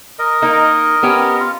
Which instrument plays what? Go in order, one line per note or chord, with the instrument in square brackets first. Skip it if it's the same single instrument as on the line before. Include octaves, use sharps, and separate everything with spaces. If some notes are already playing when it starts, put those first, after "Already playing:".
[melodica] A#4 D#5
[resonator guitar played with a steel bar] A#3 D#4
B3 C#4 G4
[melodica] F4